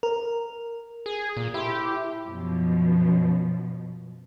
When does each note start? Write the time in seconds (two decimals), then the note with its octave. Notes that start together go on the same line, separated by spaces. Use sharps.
0.03 A#4
1.06 G#4
1.37 A#2
1.54 E4 G4 C5
2.25 F#2 B2 F3